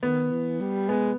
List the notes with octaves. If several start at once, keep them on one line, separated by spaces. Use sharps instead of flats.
D#3 B3
E3
G3
G#3 B3